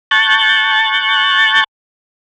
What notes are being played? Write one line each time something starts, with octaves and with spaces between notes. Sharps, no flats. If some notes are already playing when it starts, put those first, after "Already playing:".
A5 C#6 F#6 G6 A6